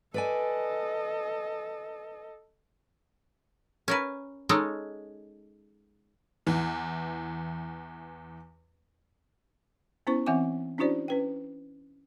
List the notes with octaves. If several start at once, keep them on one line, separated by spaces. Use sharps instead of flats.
A4 B4 D5 D#5 G#5
C#4 A#4 B4
G#3 C#4 D#4 A4
E2 E3
B3 C#4 E4 C5 C#6
E3 C4 E5 F#5 G#5 D6
C#4 D4 E4 F#4 C5 D5
C#4 B4 G5